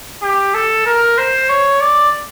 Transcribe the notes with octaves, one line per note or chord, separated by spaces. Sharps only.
G4
A4
A#4
C5
C#5
D5